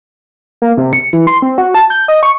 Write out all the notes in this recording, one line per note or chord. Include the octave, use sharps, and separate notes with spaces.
A#3
C3
C#7
E3
C6
C4
F#4
A5
G6
D#5
C#6